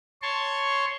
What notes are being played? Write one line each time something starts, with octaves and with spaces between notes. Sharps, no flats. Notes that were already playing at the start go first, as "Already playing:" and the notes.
C#5 A5 C6 C#6